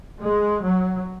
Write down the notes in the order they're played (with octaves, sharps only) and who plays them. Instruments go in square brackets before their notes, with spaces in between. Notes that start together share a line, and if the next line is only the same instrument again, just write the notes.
[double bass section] G#3
F#3